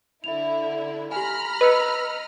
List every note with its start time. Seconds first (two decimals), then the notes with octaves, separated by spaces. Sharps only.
0.24 D3 E4 E5 F7
1.12 G4 G#5 A#5 B5 F6
1.61 B4 D#5 E6 C#7